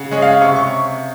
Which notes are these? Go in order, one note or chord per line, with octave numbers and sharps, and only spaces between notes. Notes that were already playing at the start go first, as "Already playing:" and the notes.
Already playing: C#3 F#5
G#3 C#4
F5
C3 C#6
C#6